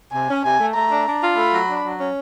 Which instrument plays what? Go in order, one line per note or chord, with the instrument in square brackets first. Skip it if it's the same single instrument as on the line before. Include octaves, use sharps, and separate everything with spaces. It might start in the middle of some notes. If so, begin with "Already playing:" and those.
[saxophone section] C3 [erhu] G#5
[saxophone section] C#4
[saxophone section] C3 [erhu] G#5
[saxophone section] A3
[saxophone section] A3 [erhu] A#5
[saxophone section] D4
D4
F4
[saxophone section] A3 [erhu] B5
[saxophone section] F#3
D4
F#3
C#4